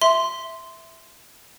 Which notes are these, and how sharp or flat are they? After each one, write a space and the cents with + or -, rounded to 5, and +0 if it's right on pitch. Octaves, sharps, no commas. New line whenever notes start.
E5 +0 C6 -5